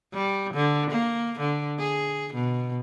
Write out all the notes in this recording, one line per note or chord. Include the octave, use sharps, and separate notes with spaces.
G3
D3
A#3
D3
G#4
B2